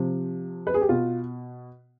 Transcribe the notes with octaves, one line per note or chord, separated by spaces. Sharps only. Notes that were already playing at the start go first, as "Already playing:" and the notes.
Already playing: C3 F3
B4
G#4
G4
B2 F4